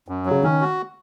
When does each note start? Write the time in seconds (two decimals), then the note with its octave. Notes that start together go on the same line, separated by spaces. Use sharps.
0.08 F#2
0.26 F#3
0.31 C#3
0.43 D#3 C#4
0.61 F#4